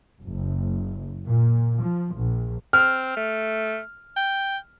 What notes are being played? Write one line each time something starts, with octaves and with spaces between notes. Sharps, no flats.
F#1
A#2
F3
A#1
C4 F6
A3
G5